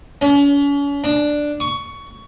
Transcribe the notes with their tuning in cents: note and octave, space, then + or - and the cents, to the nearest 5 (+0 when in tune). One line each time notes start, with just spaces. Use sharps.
C#4 +40
D4 +5
C#6 +15